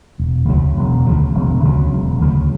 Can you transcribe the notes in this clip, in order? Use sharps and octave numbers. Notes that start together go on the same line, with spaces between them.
E1
D2 C#3 F#3
E1
D2 C#3 F#3
E1
D2 C#3 F#3
E1
D2 C#3 F#3